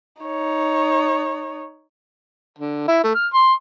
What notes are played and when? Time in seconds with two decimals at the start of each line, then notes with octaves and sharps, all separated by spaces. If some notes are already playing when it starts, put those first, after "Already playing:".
0.22 D#4 C#5
2.59 D3
2.88 E4
3.04 A3
3.15 F6
3.34 C6